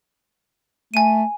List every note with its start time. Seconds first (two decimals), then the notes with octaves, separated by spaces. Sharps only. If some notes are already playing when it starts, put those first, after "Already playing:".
0.94 A3 G#5 D#7